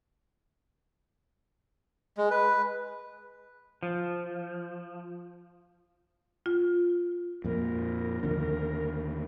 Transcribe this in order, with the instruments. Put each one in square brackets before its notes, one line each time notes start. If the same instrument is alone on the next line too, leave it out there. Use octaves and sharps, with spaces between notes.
[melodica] G#3
B4
[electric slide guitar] F3
[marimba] F4
[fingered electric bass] F2 A#2 [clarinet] A#4
[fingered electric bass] D#2 D3